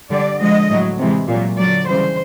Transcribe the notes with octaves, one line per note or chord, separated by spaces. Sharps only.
D3 G3 D5
D3 F3 G#3 D#5
A2 F#3
C3 E3 G#3
A#2 F#3
D3 F#3 D5
C#3 E3 G3 C5